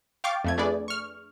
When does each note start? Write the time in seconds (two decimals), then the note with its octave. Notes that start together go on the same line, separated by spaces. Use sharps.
0.24 F5 G5 C#6 D6 A6
0.44 F2 A3 G#6
0.58 A3 D4 G#4 B4 D5
0.88 C#6 F6